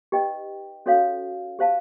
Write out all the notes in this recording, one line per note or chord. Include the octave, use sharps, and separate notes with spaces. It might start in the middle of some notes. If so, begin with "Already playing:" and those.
D#4 G4 B4 D#5 G5
C#4 F#4 A4 C#5 F5
G4 C5 F5 A5